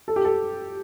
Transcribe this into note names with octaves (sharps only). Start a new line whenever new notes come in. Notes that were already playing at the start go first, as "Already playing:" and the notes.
A4
G4
A4